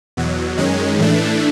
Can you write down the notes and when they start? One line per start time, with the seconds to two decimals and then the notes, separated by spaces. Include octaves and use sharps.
0.17 E2 B2 F#3
0.57 F#2 D#3 G#3 C#4
0.98 A2 E3 A3 D4